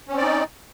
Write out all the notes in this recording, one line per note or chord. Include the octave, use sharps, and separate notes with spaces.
C4 C#4 D#4 D5